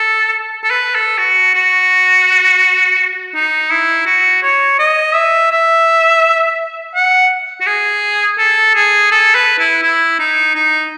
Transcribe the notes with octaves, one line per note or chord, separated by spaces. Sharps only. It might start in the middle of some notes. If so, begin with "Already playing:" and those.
Already playing: A4
A4
B4
A4
F#4
F#4
D#4
E4
F#4
C#5
D#5
E5
E5
F#5
F#4
G#4
A4
G#4
A4
B4
E4
E4
D#4
D#4